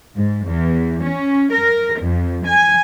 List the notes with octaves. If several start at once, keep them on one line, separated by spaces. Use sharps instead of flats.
G#2
E2
C#4
A#4
F2
G#5